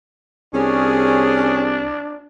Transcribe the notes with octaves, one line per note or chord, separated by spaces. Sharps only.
C2 C#4 D4 G#4